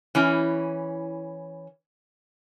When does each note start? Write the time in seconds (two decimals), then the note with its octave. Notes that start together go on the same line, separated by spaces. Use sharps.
0.15 E3 C#4 E4